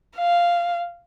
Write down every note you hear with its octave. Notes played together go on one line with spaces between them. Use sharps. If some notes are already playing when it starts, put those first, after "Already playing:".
F5